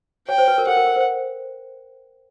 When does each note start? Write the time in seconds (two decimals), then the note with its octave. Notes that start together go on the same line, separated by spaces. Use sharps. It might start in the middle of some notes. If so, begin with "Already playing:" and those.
0.28 C#5 G5
0.38 C5
0.48 B4
0.58 A#4
0.67 A4 F#5
0.77 A#4
0.87 A#4
0.96 C5